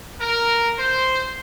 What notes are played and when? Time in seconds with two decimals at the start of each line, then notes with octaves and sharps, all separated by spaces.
0.20 A#4
0.78 C5